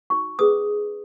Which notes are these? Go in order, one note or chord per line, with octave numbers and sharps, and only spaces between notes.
D#4 F#4 C#5 C#6
C#4 G#4 B4 D#6